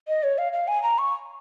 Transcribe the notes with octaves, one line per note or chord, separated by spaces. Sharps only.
D#5
C#5
F5
F5
G#5
A#5
C#6